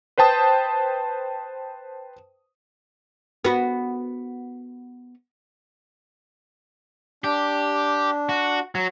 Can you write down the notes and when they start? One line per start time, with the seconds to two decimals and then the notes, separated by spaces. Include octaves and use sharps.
0.18 B4 C5 G5 A5 D#6
3.45 B3 F#4
7.24 D4 G4
8.29 F#4
8.75 F#3